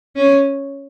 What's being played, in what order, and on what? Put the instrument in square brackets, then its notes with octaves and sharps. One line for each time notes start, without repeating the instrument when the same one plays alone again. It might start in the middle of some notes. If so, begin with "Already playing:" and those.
[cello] C#4